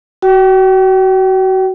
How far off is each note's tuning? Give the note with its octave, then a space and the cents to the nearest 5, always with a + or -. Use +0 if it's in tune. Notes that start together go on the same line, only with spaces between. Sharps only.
F#4 +25 G5 -30